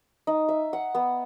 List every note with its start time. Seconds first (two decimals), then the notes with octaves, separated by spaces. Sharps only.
0.27 D#4
0.49 E5
0.73 F#5
0.95 B3